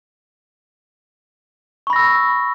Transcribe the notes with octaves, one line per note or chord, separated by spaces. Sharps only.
B5 C#6 E6 A#6